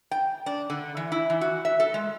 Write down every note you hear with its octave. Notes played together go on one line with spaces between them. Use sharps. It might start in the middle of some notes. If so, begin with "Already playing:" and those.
G5
D4
D3
E3
E4
E3
F#4
E5
A4
G#3